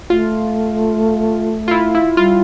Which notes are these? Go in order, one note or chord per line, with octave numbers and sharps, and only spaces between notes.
A3 F4
F4
E4
E4
G3 F4